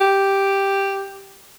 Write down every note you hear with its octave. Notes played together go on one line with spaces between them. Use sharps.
G4